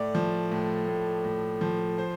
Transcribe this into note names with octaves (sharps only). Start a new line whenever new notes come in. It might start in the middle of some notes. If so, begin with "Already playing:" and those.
Already playing: A2 A3 D5
F3
A2
A2
A2
F3
C5